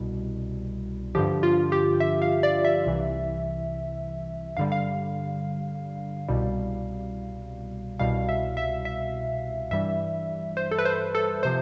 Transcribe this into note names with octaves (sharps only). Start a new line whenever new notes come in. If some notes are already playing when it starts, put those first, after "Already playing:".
Already playing: C2 B2 G3
G2 D3 F3 G4
F4
G4
E5
F5
D5
E5
C2 C3 E3
G2 D3 G3 F5
F5
C2 B2 G3
C2 B2 G3 F5
E5
E5
E5
G2 E3 G3 E5
C5
A4
B4
C5
A4
C3 F3 C5